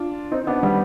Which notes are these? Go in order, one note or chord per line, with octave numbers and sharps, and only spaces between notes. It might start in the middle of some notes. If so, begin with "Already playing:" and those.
Already playing: D4 F4
C4 D#4
B3 D4
G3 B3